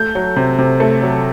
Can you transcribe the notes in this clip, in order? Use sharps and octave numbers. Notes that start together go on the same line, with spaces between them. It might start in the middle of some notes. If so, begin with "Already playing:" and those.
Already playing: A3 G6
F#3
C3
C3
A3
F#3